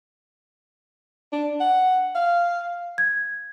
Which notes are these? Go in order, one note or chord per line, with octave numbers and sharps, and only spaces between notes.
D4
F#5
F5
G#6